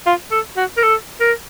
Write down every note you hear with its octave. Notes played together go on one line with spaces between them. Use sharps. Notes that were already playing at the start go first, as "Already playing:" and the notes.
F4
A4
F#4
A#4
A4
A#4